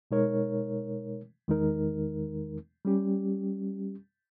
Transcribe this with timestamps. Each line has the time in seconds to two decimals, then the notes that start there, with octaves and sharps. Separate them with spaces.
0.11 B2 G#3 D#4 A#4 C#5
1.48 E2 D#3 G#3 D#4 A#4
2.85 G3 C#4 G4